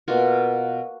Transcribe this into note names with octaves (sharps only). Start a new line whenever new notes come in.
B2 A#3 F4 F#4